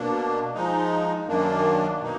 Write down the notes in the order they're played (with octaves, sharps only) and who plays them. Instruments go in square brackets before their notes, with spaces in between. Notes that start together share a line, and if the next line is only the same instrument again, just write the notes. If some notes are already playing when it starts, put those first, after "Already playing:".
Already playing: [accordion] B2 A#3 D4
F3 G#3 D#4
F#2 D#3 A#3 D4
B2 A#3 D#4